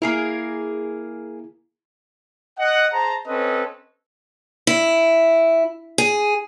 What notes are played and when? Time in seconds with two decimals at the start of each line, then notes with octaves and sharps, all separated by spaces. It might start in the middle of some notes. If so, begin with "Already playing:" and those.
0.02 A#3 E4 G#4 A#4
2.58 D#5 F#5
2.92 G#4 C5 A5 A#5
3.27 C4 C#4 A4 B4 D#5
4.67 E4
5.98 G#4